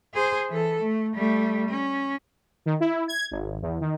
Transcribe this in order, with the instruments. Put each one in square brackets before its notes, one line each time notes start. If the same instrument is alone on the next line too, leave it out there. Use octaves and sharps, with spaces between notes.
[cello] G#4 C5
E3 A4
A3
G3 A3
C#4
[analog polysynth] D#3
E4
G#6
G#1
E2
D#3